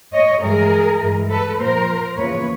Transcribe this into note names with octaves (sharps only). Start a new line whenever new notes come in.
C#5 D#5
G2 E3 G#3 G#4 A#4
G2 E3 G#3
A4 B4
A#2 F3 A#3 A#4 C5
E2 C#3 F3 A#3 B4 C#5